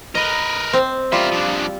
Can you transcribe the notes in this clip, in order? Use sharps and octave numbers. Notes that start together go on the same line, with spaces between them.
A#4 B4 D#5
C4
G3 F4 A#4 E5
F3 D4